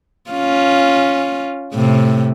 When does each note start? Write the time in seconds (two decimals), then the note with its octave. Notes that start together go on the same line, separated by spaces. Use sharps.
0.31 C#4 F4
1.74 A2 C3